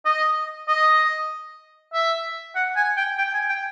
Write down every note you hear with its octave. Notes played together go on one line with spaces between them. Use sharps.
D#5
D#5
E5
F#5
G#5
G5
G5
G#5
G5